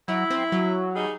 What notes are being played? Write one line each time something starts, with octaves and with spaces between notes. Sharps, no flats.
F#3 E4
C4
F#3
G3 D#4 G#4